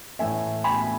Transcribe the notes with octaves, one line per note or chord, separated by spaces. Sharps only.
A2 E3 A3 E5 G#5
G#5 B5